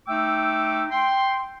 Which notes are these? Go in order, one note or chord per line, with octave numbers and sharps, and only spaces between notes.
A3 D#4 G5 D6 E6
G5 C6